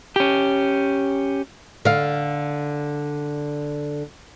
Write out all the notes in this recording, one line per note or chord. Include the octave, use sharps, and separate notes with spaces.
C#4 G4
D3 F5